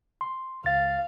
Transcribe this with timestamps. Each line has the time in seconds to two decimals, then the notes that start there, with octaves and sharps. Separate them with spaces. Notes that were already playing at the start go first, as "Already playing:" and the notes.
0.21 C6
0.64 C#2 F5 A6